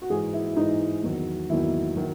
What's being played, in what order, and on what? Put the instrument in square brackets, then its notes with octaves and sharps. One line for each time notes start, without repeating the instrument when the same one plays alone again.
[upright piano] F#4
G#2 E3 G#4
E4
G#2 E3 D#4
E2 D#3 F#3
E2 D#3 F#3 E4
D#3 F#3